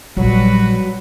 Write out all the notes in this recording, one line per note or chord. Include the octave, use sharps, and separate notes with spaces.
A#1 F#3 G3 F#4 B4